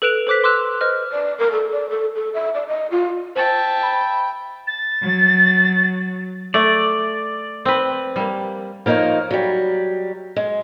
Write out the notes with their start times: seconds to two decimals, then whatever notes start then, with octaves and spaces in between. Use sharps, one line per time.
0.02 A4 B4 F#6 D7 E7 F7
0.27 A4 C5 D6 F#6 B6
0.44 C6 D6 E6 F#6 E7
0.81 B4 C5 D#5 F6
1.11 D5
1.39 A#4
1.52 A4
1.71 D5
1.90 A4
2.15 A4
2.34 E5
2.54 D5
2.68 D#5
2.91 F4
3.36 C5 E5 G5 A5 A6
3.83 B5
4.67 A6
5.02 F#3
6.54 A3 D5
7.65 C4 B4
8.16 G3 A#3
8.86 F3 A#3 D#4 A#4 C#5
9.31 F#3 G3
10.36 G#3